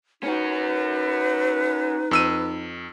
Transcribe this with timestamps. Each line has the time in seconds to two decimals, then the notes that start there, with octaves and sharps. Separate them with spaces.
0.23 C#4 D#4 F#4 B4
2.11 F2 E6 D#7